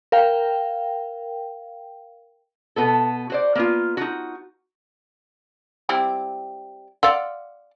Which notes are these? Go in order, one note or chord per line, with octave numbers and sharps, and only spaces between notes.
A#4 F5 G5
B2 B3 A4
F#4 C5 D5
A#3 B3 F4
D#4 F4 F#4
G3 C4 E4
D5 F5 F#5 C6 E6